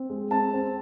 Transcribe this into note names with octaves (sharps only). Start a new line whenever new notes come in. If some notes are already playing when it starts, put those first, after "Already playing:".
Already playing: C4
G#3
C4 A5
C4